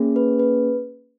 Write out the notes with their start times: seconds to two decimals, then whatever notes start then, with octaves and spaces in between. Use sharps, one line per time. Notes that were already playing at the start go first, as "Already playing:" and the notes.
Already playing: A#3 C#4 G#4
0.16 B4
0.39 B4